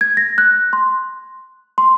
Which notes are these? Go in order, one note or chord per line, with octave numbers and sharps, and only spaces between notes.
G#6
A#6
F#6
C6
C6